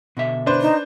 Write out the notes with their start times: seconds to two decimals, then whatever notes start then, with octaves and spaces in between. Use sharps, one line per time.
0.17 B2 D3 E5
0.46 D4 B4 C5
0.61 D#4